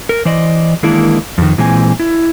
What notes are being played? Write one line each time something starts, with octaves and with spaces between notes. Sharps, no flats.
A#4
E3 C5 D5 D#5
D#3 E3 G#3 A#3 D4 E4
F2 D#3
A#2 E3 G#3 C4 G#5
E4